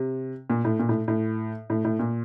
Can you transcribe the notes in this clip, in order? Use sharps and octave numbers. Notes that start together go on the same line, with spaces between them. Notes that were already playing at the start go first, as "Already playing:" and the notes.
Already playing: C3
A#2
A2
A#2
A2
A2
A2
A2
A#2